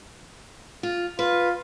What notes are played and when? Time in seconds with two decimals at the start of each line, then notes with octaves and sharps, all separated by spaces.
0.83 F4
1.19 F4 B4